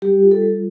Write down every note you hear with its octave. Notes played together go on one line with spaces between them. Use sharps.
G3 G4
F4
A4
G3